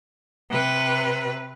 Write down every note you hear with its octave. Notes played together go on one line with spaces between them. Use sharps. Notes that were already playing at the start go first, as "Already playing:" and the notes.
C3 B4